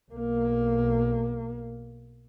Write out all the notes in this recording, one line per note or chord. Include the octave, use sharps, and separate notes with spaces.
B1 A#3